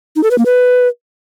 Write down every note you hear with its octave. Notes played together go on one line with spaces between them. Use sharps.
D#4
A4
B4
A#3
B4